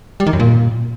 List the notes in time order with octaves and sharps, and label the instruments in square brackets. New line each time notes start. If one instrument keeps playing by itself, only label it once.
[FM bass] G3
D#3
F#2
A#2